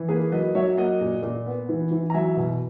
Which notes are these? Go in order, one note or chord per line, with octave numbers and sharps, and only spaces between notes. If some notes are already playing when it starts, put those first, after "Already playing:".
Already playing: E3
A#3 G#4 B4
F#3 B4 D#5
F#3 C#5 E5
A#3 D#5 F#5
A#2
A#2
B3
E3
E3
A#5
F#3 E5 G#5
B2